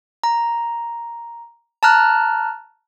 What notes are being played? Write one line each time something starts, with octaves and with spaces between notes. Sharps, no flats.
A#5
A5 A#5 F6 F#6